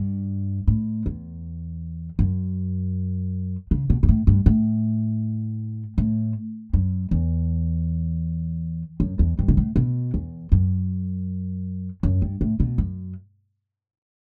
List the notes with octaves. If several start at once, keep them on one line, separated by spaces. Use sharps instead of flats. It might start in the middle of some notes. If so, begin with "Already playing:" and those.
Already playing: G2
A2
E2
F#2
C#3
B2
G2
A2
G2
A2
A2
F#2
E2
F#2
E2
G2
B2
A2
B2
E2
F#2
F#2
G2
A2
B2
F#2